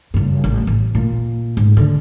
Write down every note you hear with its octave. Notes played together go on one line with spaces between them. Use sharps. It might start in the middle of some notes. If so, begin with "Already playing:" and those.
F#1 G2
A1
A1
A#2
G#2
D3